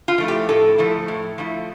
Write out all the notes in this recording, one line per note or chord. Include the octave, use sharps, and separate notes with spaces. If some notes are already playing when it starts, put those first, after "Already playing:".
F4
F3 A3 E4
G4
A2 A4
F3 A3 E4
A2
F3 A3 E4